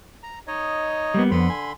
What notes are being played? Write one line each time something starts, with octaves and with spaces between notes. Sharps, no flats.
A#5
D#4 C#5 D#5
G3 A#3 B3
F2 D3 B3 B5 C6
G#5